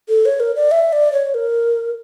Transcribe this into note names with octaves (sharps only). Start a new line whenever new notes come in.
A4
C#5
A#4
D5
E5
D5
C#5
A#4